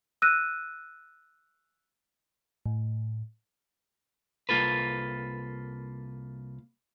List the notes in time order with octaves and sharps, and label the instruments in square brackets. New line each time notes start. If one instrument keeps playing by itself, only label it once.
[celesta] E6 F#6 A#6 D#7
[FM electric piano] A2
[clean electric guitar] C2 A#3 F4 A4 B4